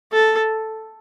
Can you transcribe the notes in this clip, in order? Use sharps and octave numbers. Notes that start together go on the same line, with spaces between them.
A4